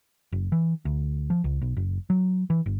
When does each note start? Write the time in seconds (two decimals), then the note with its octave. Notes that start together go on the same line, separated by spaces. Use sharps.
0.32 F#1
0.52 E3
0.85 D2
1.30 F3
1.44 C#2
1.62 B1
1.77 F#1
2.10 F#3
2.50 E3
2.66 G1